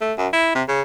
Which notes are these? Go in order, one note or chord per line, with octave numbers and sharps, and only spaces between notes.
A3
F#2
E4
C3
C#3